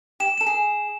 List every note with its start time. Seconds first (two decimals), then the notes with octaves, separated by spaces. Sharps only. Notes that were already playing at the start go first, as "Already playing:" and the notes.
0.20 G4 E7
0.38 A4 E7
0.46 G#4